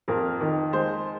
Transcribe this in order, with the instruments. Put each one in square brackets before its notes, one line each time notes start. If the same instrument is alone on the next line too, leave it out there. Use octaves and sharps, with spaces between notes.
[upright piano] F2 A#4
D#3
G#3 C5